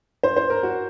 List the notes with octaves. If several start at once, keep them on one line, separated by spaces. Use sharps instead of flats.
C5
C5
A#4
F#4